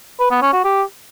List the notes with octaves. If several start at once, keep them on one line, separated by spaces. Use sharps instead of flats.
B4
B3
C#4
F#4
G4